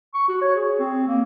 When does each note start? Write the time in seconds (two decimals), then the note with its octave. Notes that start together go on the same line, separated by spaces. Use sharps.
0.15 C#6
0.29 F#4
0.42 C#5
0.56 G#4
0.80 C4
1.08 A#3